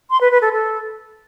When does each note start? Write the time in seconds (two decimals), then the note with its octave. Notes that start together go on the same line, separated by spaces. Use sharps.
0.10 C6
0.21 B4
0.31 B4
0.42 A4
0.52 A4